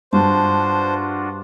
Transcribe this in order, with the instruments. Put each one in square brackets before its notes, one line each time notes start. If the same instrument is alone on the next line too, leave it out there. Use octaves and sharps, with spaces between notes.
[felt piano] G2 [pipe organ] D4 F4 F#4 [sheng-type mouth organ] C5 [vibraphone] A5